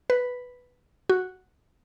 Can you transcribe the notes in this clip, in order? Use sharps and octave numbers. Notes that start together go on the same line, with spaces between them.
B4
F#4